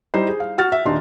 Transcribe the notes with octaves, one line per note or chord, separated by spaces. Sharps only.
G3 D#4 E4 C5
G#4
F5
F#4 F6 A6
E5
D#1 D4 D#4 C6